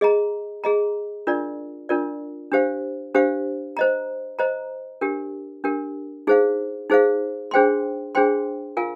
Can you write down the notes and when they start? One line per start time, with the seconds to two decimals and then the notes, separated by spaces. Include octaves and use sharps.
0.01 G#4 D#5 A#5
0.64 G#4 D#5 A#5
1.27 D4 F4 A#4 D5
1.89 D4 F4 A#4 D5
2.52 D4 G4 C5 F5
3.15 D4 G4 C5 F5
3.77 C5 D#5 A#5
4.39 C5 D#5 A#5
5.01 D4 G4 A#4
5.64 D4 G4 A#4
6.27 D#4 G#4 C5 F5
6.90 D#4 G#4 C5 F5
7.51 D4 G#4 C5 G5 C6
8.15 D4 G#4 C5 G5 C6
8.77 F4 A#4 F5 G#5